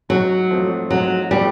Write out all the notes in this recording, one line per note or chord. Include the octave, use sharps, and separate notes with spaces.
G#2 F#3
F3 A3 C4
G#2 F#3
F3 G3 A3 C4